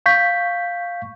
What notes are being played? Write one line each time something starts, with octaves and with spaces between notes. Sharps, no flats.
F5 C#6 G6 B6